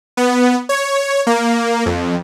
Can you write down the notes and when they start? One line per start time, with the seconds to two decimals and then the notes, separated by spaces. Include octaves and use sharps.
0.17 B3
0.69 C#5
1.27 A#3
1.86 F2